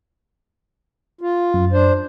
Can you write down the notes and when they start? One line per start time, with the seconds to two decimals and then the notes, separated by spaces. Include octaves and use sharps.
1.21 F4
1.54 F#2
1.73 D4 C5